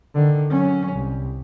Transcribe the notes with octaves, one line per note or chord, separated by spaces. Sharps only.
D3 D#3
F#3 C#4
C2